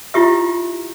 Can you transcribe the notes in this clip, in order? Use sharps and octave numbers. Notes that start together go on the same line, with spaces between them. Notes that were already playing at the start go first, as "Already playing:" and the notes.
E4 F4 G4 E5